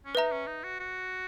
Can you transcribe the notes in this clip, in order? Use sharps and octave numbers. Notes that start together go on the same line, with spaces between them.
C#4
D#4 B4 E5 A#5
C#4
D#4
F#4
F#4